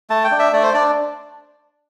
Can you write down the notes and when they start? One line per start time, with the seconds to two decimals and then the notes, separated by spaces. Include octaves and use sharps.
0.10 A3 A5
0.24 G5
0.31 D4
0.39 E5
0.53 A3 D5
0.63 C5
0.74 D4 D5